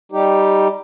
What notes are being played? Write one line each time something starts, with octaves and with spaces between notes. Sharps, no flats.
G3 D#4 G4